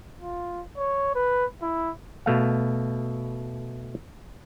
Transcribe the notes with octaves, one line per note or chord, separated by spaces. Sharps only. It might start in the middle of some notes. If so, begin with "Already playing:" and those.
F4
C#5
B4
E4
B2 A3 F5